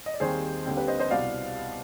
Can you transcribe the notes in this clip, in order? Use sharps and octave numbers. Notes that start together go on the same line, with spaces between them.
D#5
D5
D#2 D#3 G3 C4 G#4 C5
D#2 D3 G3 C4
G4 B4
C5 D#5
C5 D#5
C2 B2 B3 D5 F5